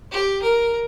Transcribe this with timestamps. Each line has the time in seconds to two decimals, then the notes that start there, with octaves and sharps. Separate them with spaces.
0.12 G4
0.42 A#4